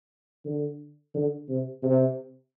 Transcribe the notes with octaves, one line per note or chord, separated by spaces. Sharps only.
D3
D3
C3
C3